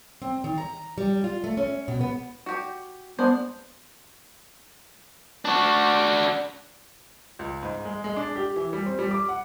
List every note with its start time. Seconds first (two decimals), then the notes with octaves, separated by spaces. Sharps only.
0.22 C4
0.44 D#3
0.58 A#5
0.98 G3
1.24 F4
1.44 A3
1.57 C#4
1.88 B2
2.01 B3
2.46 F#4 G4 G5
3.19 G#3 B3 D4 C5
5.45 D4 F#4
7.39 C#2
7.63 G#2
7.85 G#3
8.04 G#3
8.16 D4
8.36 G4
8.56 E3
8.73 G3
8.86 C4
8.99 G3
9.11 D6
9.29 F#5